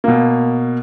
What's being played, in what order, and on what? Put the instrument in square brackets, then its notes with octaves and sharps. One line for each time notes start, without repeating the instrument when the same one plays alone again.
[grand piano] B2 A#3